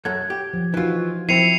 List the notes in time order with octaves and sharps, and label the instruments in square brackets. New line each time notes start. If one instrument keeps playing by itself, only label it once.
[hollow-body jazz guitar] F#2 A4 F#5 [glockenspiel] G#6
[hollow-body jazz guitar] G4
[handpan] F3
[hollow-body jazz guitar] E3 F4 [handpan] D#4 F#4
[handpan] F3 [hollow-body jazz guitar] C4 E4 [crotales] C7 C#7 F7 [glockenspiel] D#7